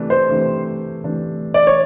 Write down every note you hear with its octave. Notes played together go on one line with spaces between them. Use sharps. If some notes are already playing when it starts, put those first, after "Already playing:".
Already playing: C3 E3 A3 D4
C5
C3 E3 A3 D4
C3 E3 A3 D4
D5
C#5